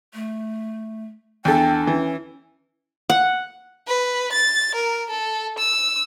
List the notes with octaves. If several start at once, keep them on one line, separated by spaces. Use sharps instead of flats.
A3
E2 D4 A4 G5
E3 C#4
F#5
B4
A6
A#4
A4
E6